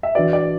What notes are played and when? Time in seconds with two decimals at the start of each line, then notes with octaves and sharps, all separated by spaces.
0.03 E5
0.15 E3 D4 F#4 B4 D5
0.33 D5